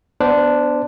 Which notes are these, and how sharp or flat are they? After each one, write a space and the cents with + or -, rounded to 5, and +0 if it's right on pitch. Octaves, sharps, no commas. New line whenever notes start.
B3 +5 D4 +0 C5 -20